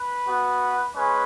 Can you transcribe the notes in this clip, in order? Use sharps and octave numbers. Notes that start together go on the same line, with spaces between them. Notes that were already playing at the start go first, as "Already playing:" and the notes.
Already playing: B4
B3 F#4
G#3 C#4 B4